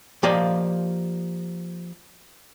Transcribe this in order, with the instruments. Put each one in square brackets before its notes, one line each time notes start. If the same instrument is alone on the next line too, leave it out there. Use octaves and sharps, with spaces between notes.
[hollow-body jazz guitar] F3 A#3 G4 D5 D#5 F5